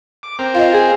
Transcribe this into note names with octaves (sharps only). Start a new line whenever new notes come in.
D6
C4 A#4
F4 D#5 F5
G#4